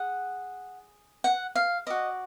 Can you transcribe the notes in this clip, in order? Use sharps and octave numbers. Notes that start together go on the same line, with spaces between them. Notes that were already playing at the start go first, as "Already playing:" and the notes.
Already playing: G#4 F#5
F#5
F5
F#4 D5 D#5